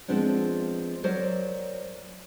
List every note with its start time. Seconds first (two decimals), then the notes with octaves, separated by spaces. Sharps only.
0.08 F3 G#3 B3 C4 D4
1.04 F#3 A#4 C5 D5